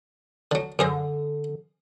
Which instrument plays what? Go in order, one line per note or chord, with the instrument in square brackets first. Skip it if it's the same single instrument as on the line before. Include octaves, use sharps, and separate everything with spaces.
[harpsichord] D3 F#3
[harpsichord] F#2 G#4 C5 [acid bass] D3